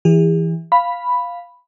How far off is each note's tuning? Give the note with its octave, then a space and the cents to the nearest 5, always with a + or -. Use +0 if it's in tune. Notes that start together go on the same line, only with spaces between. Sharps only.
E3 +0 G#4 -45
F5 +0 B5 +0